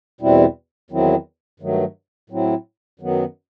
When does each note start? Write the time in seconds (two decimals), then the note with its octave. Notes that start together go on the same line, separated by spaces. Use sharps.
0.21 E2 B2 G3 C4 E4
0.91 E2 D#3 F#3 C4 E4
1.60 G2 D#3 F#3 A3
2.30 A2 F#3 C4 E4
3.00 F#2 D#3 F#3 B3